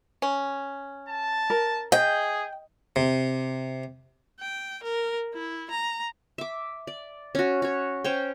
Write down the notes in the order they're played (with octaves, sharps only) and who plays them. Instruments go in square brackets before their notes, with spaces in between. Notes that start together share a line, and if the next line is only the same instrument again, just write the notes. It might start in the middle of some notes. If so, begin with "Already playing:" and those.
[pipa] C#4
[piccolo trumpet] A5
[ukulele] A#4
[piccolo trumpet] G#4 [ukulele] D#5 [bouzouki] G5
[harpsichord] C3
[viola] G5
A#4
E4
A#5
[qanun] E5 D6
D5
C#4 F#4
F#4 C#5
C#4 C5 C#5 G5